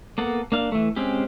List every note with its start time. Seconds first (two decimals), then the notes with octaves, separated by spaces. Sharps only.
0.18 A#3 B3 A4 F#5
0.52 A#3 D4 F5
0.72 E3 A3
0.96 G#3 C4 C#4 G4